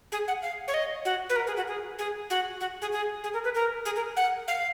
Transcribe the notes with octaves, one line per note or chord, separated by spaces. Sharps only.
G#4
F#5
F5
C#5
D#5
F#4
B4
A#4
G#4
F#4
G#4
G#4
F#4
F#4
G#4
G#4
G#4
A#4
B4
A#4
G#4
A#4
F#5
F5